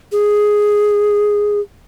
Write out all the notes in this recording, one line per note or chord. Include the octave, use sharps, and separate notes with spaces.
G#4